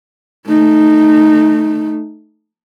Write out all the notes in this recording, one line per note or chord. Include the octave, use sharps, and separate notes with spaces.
A3 D#4